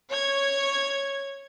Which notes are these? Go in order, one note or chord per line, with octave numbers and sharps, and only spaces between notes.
C#5 G#6